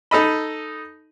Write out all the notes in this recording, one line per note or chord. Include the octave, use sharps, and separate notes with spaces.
D#4 A4 D#5 B5